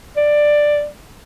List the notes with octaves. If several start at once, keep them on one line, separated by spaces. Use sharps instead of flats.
D5